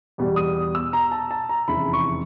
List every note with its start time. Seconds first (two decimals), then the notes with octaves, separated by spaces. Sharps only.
0.18 E2 B2 G3
0.36 D#6
0.75 E6
0.93 A#5
1.11 A5
1.31 A5
1.49 A#5
1.68 F1 E2 C#3 E3 G#3 B5
1.93 C#6